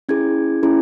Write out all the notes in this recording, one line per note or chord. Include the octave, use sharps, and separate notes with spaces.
C#4 E4 G#4 G#6
C#4 E4 G#4